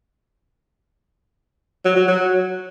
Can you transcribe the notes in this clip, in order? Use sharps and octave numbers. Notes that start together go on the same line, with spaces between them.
F#3
F#3
F#3